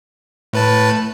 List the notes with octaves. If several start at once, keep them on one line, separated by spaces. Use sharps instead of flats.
A2 B4 A5